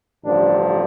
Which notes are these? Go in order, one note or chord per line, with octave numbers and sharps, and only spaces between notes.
A1 G2 D3 F3 D4